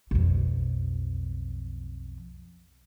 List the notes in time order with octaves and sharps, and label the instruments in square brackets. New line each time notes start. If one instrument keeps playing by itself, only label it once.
[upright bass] B1 F2